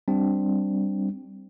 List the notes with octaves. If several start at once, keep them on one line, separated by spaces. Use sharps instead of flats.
G3 C4 D4